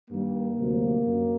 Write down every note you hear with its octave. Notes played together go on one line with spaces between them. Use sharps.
G2 D#3 G3 A#3
D2 C3 F#3
F#2 F#3